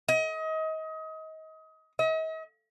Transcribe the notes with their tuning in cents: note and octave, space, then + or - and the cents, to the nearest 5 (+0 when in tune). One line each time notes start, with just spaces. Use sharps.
D#5 +30
D#5 +45